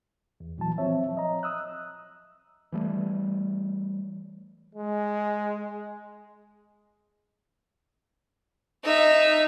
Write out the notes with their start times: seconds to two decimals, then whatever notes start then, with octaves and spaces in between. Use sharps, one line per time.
0.40 E2
0.58 A#2 E3 F#3 A5
0.78 F3 C4 C#5 E5
1.17 D#5 A#5
1.43 D#6 E6 F#6
2.72 E3 G3 A3
4.75 G#3
8.84 D#4 E5